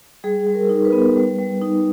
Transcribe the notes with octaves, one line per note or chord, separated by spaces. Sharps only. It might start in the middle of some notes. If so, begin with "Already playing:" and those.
G3 G#4
G3
A#4
D#4
B4
B3
G3
G3
D#4